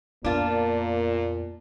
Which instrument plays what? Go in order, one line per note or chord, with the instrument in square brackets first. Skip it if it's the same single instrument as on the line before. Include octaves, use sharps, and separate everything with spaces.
[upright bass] F2 B3 [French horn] A#2 [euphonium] A#3 [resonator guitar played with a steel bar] D4 F4